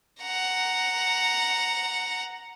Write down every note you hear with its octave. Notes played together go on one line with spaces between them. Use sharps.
F#5 A#5